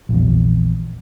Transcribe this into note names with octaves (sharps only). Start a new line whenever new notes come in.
A#1 E2